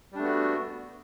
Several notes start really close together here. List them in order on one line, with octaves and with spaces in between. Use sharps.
G3 D4 A3 B3 F#4